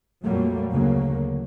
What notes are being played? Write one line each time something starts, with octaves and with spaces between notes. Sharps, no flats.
F2 A#2 F#3 G3 A3 A#3
D2 C#3 F#3 A#3